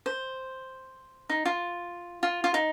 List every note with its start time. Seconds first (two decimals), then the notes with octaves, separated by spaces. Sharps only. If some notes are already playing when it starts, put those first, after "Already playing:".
0.06 C5
1.29 D#4
1.45 F4
2.23 F4
2.44 F4
2.54 D#4